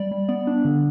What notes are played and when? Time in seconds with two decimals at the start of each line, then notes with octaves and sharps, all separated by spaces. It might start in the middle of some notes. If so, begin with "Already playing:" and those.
Already playing: G3 D5
0.11 G3
0.28 B3 D5
0.47 D4
0.65 D3